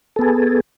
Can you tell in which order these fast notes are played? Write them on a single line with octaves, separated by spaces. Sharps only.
A4 B3 G#4